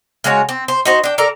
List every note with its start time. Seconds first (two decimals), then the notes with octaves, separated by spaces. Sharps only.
0.24 C#3 G#3 F#4 C#5
0.49 C4
0.68 C5
0.85 D#4 F#4 C5
1.04 D4 G5
1.18 A4 A#4 D5 A#5